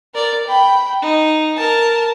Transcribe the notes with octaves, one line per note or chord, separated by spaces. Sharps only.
A#4 D5
G5 B5
D#4
A#4 A5